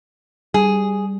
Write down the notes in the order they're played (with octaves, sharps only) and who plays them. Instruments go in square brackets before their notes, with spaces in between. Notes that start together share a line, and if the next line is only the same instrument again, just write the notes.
[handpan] G3 [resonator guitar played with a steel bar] G#4